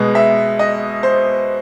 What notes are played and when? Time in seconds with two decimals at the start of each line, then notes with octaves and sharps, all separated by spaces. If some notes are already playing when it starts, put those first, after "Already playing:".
Already playing: B2 G#3 B3 D#5
0.15 E5
0.59 D#5
1.03 C5